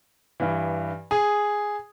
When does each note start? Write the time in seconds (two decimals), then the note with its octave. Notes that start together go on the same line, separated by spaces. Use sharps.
0.40 G2 E3
1.11 G#4